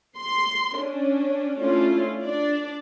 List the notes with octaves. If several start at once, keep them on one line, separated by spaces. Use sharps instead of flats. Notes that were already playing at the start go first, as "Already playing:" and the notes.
C6
C#4 D4
A3 C#4 D4 E4 F4
D4 D5